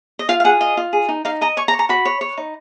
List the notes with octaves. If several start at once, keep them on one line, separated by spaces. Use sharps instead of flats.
D#5
F4 F5
F5
G#4 F#5
F4 D#5
F4
G#4
D#4
D#4 F5
D#5 A#5
C#5 C#6
A#5
C#5
A#5
F#4 B5
C#5
C#5
D#4